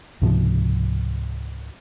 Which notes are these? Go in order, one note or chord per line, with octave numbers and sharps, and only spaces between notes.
C#2 G#2 C3 F3